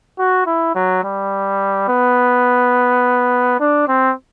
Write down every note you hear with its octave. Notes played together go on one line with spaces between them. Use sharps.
F#4
E4
F#3
G3
B3
D4
C4